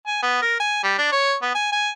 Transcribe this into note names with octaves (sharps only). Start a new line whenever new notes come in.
G#5
B3
A#4
G#5
G3
D4
C#5
B3
G#5
G#5